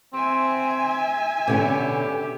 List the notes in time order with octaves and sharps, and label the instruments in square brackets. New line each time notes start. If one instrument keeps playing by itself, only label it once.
[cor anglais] C4 [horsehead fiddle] E5 G#5
[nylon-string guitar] B2 D3 C#4 [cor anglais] G4